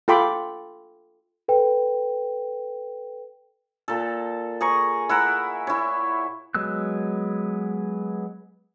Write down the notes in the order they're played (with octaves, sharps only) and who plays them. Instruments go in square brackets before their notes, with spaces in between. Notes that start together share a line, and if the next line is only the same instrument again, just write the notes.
[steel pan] F4 A4 G5 B5 C6 D6
[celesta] A4 B4 G5
[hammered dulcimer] A#2 A4
G#4 A#5 C#6
E4 F#5 A#5
E4 C#5
[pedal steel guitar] F#3 G#3 B3 E6 F#6